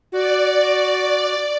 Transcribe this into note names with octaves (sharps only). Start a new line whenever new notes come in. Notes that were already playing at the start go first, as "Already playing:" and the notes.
F#4 D5